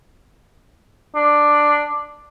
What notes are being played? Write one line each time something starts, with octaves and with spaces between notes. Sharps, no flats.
D4